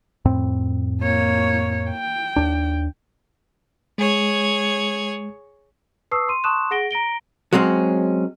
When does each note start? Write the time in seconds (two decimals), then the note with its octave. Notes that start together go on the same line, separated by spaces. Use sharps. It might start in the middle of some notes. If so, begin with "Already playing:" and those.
0.25 F2 A2 C4
1.01 A#3 C#5
1.91 G5
2.36 D#2 D4
3.98 G#3 G#4 C#5
6.11 B4 A5 C#6 D#6 E6 C7
6.28 C6 D#7
6.44 A5 C6 C#6 D#6 F#6 E7
6.71 G#4 F#5 A#6 D7 G7
6.91 A#5 A#6 D7 G7
7.53 F#3 G#3 C4 C#4